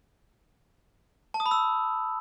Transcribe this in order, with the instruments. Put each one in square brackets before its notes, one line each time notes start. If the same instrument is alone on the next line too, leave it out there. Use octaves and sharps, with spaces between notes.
[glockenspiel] A5
D#6
B5
E6